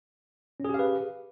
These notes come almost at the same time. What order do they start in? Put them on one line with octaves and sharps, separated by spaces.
C#4 G#4 G4 F5 B4